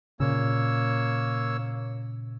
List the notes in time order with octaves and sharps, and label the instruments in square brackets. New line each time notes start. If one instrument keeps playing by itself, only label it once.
[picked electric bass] A#2 C#3 [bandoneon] A#3 C#5 E6